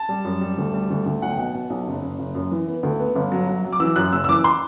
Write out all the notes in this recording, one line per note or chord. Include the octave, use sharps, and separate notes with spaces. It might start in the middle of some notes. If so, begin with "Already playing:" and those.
Already playing: A5
G3
F#2
G3
D2
G3
D2
D2
B1 F#5
G5
B2 F#5
B2
B1
F#1
F#1
F#1
F#2
E3
B3
D2
B3
G1
F#3
F#3
F#3
D6
E3 E6
F#2 F#6
F#1 E6
E6
E3 D6
C6